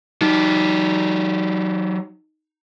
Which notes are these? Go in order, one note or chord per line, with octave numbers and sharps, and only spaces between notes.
F#3 D#4 G4